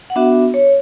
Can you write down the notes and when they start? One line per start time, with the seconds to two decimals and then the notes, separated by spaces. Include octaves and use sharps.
0.10 F#5
0.16 B3 D4 F#4 E5
0.54 C#5